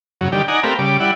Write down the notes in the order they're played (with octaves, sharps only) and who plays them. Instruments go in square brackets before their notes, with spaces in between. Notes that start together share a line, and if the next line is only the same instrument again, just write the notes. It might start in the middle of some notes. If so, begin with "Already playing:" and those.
[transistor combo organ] F#2 C#3 F#3
D3 D#3 G3 G4
D#4 D5 F#5 G#5 A#5
A3 C4 G4 A#4 B4 F5
C#3 G3 D6
G3 E4 D5 F#5